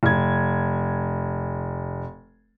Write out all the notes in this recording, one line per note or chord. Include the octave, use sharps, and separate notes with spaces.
F1 G#6